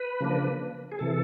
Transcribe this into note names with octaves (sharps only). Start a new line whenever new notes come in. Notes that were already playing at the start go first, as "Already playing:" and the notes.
Already playing: B4
C#3 F3 A#3 D4
G#4
C3 E3 A4